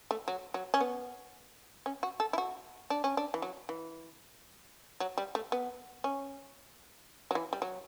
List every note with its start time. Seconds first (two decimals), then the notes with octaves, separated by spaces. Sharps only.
0.11 A3
0.28 F#3
0.54 F#3
0.74 C#4
0.80 B3
1.86 C#4
2.03 F#4
2.20 A4
2.33 E4
2.38 F#4
2.90 D4
3.04 C#4
3.17 D4
3.34 E3
3.42 F#3
3.69 E3
5.00 F#3
5.18 G3
5.35 A3
5.52 B3
6.04 C#4
7.31 F#3
7.35 E3
7.53 G3
7.62 F#3